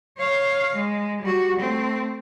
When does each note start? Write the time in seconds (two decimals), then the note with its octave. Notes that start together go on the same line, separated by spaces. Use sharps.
0.18 C#5 F5
0.75 G#3
1.22 G3 F#4
1.59 A3 C4